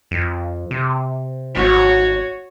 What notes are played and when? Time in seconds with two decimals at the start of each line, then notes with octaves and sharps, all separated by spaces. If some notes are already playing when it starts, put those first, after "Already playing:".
0.11 F2
0.71 C3
1.56 G#1 F#4 C#5